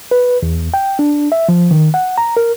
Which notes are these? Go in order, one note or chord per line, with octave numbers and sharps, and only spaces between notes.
B4
E2
G5
D4
E5
F3
D#3
F#5
A#5
A#4